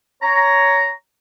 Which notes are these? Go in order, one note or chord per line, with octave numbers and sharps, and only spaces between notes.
C#5 A#5